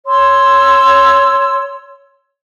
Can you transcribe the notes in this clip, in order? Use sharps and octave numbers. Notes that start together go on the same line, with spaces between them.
C#5 C6 E6